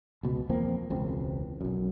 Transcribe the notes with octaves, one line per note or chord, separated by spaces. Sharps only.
C#2 B2
E2 F3 A#3 C4
E1 C#2 C4
B1 F#2